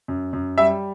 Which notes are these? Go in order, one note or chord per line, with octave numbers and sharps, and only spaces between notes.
F#2
F#2
G3 E5